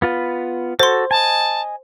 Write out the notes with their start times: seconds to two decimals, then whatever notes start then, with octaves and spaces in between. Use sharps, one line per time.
0.02 B3 F4 B4
0.79 F#4 A4 C5 C6
1.11 D#5 G#5 A5